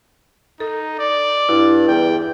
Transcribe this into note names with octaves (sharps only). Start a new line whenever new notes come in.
D#4 A4
D5
G2 E4
E2 G5